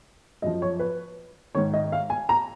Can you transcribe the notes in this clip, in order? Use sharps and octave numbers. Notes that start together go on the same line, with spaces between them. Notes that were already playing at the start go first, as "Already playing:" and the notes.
F#2 F3 D#5
C#5
B4
G#2 D#3 C#5
D#5
F5
G#5
A#5